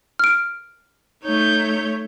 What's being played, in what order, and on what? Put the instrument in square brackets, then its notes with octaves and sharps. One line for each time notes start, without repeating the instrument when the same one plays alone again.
[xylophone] F6 D7
[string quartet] A3 C#5 [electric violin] D#4 G6